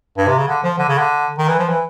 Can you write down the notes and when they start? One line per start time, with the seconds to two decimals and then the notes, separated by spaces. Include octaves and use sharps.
0.18 G2
0.27 C3
0.38 C#3
0.48 D3
0.63 F3
0.78 D3
0.88 C#3
0.98 D3
1.38 D#3
1.48 E3
1.59 F3
1.69 E3